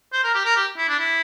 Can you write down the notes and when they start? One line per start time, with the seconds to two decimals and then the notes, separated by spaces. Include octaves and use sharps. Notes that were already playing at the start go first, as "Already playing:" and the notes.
0.13 C5
0.24 A#4
0.34 G4
0.45 A#4
0.56 G4
0.77 E4
0.89 D4
0.99 E4